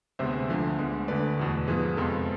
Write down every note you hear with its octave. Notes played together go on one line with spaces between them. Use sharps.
D2 C3 G#3 B3 C5 E5
D2 D3 F3
D2 D3 G#3 B3
D2 D3 A3 B4 D5
E2 B2 A3
G#2 F3 B3 G#4 B4
F2 C3 G#3 B3 F4 A4